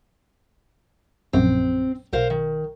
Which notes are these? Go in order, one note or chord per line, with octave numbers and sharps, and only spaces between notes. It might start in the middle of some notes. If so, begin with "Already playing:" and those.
A#1 F#2 C4
B1 A#4 C5 F5
D#3